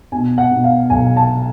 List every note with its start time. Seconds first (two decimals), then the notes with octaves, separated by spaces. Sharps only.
0.12 B2 G#5
0.38 F#5
0.51 B2
0.64 F5
0.90 B1 G#5
1.16 A5